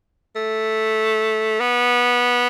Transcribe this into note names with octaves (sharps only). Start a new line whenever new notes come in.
A3
B3